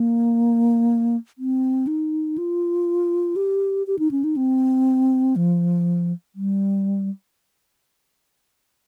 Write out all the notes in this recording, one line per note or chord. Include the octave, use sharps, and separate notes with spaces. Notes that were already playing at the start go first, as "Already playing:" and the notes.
Already playing: A#3
C4
D#4
F4
G4
G4
D#4
C#4
D#4
C4
F3
G3